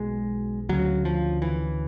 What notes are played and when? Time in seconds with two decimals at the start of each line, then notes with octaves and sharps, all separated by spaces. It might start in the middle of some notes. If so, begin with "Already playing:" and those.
Already playing: B1 B2 G#3
0.69 D2 C#3 F#3
1.05 F3
1.42 E3